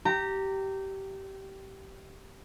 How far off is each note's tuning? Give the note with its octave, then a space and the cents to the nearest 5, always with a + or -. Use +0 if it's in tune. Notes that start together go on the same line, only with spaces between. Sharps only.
G4 -20 A#5 -20